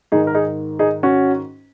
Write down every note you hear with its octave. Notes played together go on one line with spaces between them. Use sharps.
G#2 D#3 D#4 G#4
A#4
D#4 G#4
D#4 G#4
C#4 F#4